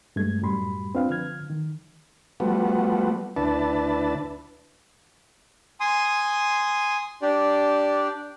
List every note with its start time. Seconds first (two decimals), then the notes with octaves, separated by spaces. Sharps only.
0.16 G2 G#3 A3 G#6
0.42 F#2 A2 F#3 G3 B5 C6
0.95 C4 D4 F4 B4 F5
1.10 D3 F3 F6 G#6
1.50 D#3
2.40 F3 G3 A3 B3 F#4
3.37 D2 D4 E4 B4 A5
5.80 G#5 C6 D#6
7.22 D4 G4 D5